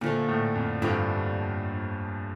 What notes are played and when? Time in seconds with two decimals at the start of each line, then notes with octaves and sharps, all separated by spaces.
0.01 A#2 D3 F3 A3
0.28 A2
0.55 F2
0.82 G2 F3 A3 D4 G4